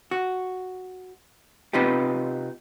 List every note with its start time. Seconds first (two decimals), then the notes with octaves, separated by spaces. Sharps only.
0.11 F#4
1.73 C3 B3 D#4 F4 G4